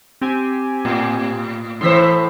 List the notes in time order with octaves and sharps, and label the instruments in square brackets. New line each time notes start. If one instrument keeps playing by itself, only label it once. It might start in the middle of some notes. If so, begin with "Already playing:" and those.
[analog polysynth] C4 G4 G#5
[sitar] A2
[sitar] A2 E3 C5 [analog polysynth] C6 E6 B6